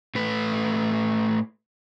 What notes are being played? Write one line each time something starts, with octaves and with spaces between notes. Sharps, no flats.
A2 A3 B4